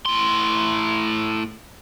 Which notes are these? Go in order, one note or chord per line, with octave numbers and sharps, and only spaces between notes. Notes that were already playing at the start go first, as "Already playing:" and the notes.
A2 C6